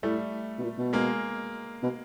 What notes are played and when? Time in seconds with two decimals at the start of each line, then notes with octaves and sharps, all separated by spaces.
0.03 A2 G3 A3
0.59 B2
0.63 A#2
0.78 B2
0.93 G#3 A#3
1.83 B2